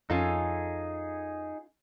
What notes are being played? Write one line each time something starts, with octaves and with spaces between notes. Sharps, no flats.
F2 C#4 D#4 F4 G#4 A4